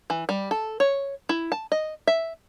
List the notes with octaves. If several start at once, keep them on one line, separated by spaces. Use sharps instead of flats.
E3
G3
A4
C#5
E4
A5
D#5
E5